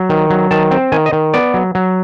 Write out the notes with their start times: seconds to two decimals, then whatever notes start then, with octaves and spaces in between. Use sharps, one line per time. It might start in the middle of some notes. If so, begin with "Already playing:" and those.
Already playing: F#3
0.10 D#3
0.30 F#3
0.51 D#3 A5
0.71 C4
0.92 D#3 G#5
1.06 D#5
1.13 D#3
1.34 B3 D5
1.54 F#3
1.75 F#3